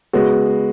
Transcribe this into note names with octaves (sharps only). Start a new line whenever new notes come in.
C#3 G#3 B3 F#4